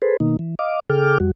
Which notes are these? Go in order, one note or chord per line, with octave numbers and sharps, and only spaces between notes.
G#4 A4 B4 C5
B2 D#3 A#3 D#4
E3
D#5 F5 D6
C#3 G#4 A4 G5 D6 F6
F2 G3 F#4